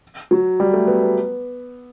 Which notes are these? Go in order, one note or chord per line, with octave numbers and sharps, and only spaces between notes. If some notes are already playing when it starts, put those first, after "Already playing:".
F#3
G3
A3
B3
B3